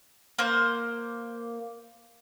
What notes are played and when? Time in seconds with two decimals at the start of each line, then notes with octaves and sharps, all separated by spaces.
0.39 A#3 C5